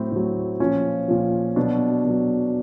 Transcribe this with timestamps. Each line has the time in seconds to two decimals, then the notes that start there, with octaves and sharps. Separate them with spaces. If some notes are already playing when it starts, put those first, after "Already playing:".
Already playing: A2 F#3 C4
0.12 A2 F#3
0.60 A#2 F3 C#4
1.08 A#2 F3
1.56 B2 F#3 D4
2.05 B2 F#3